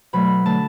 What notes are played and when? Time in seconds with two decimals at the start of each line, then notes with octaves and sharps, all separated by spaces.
0.13 B2 F#3 A3 B5
0.45 D3 A3 A5